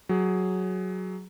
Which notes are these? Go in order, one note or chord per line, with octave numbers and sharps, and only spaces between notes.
F#3 G#4